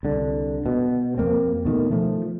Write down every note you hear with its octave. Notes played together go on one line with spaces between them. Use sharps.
C2 D3
B2
F2 A#3 C4
B2 D#3 A3
F3 A3